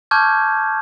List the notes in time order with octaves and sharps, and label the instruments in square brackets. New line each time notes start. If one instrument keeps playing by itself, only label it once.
[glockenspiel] A5 C#6 D6 F6 G6 G#6